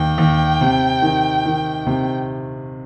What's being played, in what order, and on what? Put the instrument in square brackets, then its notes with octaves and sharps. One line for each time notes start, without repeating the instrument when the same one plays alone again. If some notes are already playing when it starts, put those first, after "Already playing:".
Already playing: [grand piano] D#2 [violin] G5
[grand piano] D#2
C3
D#3
D#3
C3